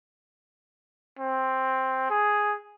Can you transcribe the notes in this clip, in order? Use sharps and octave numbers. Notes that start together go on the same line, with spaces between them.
C4
G#4